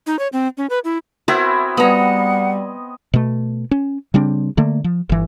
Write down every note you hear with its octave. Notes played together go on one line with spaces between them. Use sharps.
D#4
C#5
C4
C#4
B4
E4
B3 C4 E4 F#4 A#4 E5
G3 B3 D#5 F#5 A#5
B2 A3
C#4
C#3 G3 C4 D4
D3 A3 A#3
F3
G1 E3